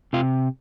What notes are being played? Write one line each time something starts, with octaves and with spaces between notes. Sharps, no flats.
C3 F4